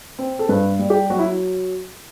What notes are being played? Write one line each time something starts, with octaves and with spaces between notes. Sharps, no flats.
C4
A4
G2 B4
G3
G4
F#3 F#4
E4